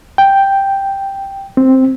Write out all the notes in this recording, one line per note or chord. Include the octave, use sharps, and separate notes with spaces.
G5
C4